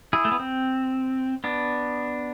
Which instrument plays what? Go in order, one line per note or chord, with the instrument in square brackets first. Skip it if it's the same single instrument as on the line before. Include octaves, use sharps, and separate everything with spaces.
[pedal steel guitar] E4 G#4
A3
B3
C4
B3 D4